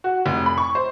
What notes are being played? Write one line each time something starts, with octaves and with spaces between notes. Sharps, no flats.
F#4
F1
B5
C#6
C5